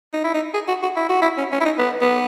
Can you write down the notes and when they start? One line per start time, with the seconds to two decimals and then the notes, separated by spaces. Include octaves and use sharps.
0.13 D#4
0.24 E4
0.34 D#4
0.54 G#4
0.68 F#4
0.82 F#4
0.96 E4
1.09 F#4
1.22 E4
1.38 C#4
1.52 C#4
1.60 E4
1.65 D#4
1.78 B3
2.01 B3